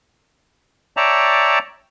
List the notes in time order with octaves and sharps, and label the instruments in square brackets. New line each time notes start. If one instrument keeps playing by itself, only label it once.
[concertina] C#5 D5 E5 G5 A5 A#5